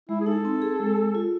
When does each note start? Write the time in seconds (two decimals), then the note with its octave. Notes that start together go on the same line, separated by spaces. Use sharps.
0.09 G#3 E4
0.21 G#4
0.26 D#4 A4
0.45 C4
0.62 G#4
0.80 G#3
0.97 G#4
1.15 F4